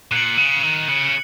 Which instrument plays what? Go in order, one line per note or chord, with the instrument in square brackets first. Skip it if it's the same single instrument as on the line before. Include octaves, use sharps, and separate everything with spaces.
[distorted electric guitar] A#2 [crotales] F#6 C#7 F#7
[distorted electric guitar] C#3
D#3
[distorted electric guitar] C#3 [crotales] F#6 C#7 F#7